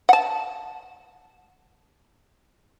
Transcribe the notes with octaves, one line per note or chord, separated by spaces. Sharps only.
F#5 A5